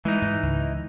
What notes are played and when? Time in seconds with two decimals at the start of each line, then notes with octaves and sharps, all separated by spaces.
0.05 E3 G#3 D#4
0.22 G#2
0.43 C#2